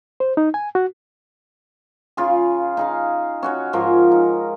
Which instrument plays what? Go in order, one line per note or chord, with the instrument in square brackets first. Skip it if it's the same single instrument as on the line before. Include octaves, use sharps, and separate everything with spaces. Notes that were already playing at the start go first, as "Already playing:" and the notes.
[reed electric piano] C5
D#4
G#5
F#4
[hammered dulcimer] C#3 F4 G#4
D#4 G#4 F5
C#4 F#4 C#5
G#2 F3 F4 A#4
D#4